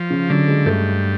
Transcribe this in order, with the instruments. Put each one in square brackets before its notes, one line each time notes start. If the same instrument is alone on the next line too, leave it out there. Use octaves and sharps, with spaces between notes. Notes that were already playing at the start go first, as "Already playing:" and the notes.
Already playing: [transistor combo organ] F3
[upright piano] C#3
[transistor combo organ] D3 [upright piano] F#3
[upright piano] G#3
[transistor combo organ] G2 [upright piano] A3